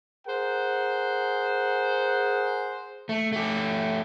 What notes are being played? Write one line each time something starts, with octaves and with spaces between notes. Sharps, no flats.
G#4 A#4 C5 F#5
A3
A3 G4